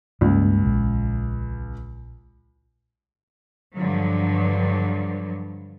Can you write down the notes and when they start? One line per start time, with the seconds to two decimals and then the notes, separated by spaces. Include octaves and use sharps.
0.21 C#2 G2 A#3 C#4
0.66 A#1
3.77 G2 D3 F3 F#3